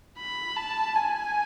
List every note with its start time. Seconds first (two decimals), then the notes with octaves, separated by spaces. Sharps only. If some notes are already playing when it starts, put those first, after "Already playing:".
0.19 B5
0.57 A5
0.96 G#5